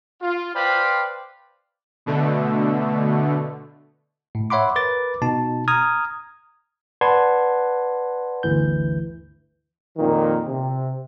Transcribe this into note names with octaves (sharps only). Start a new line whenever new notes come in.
F4
B4 C5 D5 F5 G5 B5
B2 D3 A3
A2
C#5 E5 F#5 B5 C6 D6
A#4 B4 D6 A6
B2 D#4 A5
A#5 D#6 F6 G#6
B4 D5 F#5 A5 C6 G#6
G1 D2 E3 G6
F2 A#2 D#3
C3